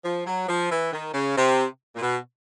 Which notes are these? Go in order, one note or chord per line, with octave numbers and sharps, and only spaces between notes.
F3
F#3
F3
E3
D#3
C#3
C3
A#2
B2